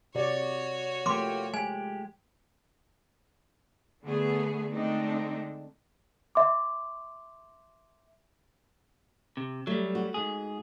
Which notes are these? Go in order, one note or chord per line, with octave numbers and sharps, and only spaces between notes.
C3 F#4 C#5 D5
F3 A3 A#3 G4 C6 D6
G#3 G4 G#5
D3 A3 B3 G#4
D3 G#3 A3 C4 D4 D#4
E5 C6 D6
C3
F#3 G3 A3
F#4
G#2 G#4